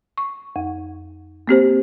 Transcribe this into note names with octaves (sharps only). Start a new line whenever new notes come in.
C#6
F2
A#3 C4 G4 C5